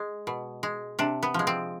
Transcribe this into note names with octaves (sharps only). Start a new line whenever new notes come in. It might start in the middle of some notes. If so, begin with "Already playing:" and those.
Already playing: G#3
B2
G#3
C3 D4
B3
F3 G#3
C4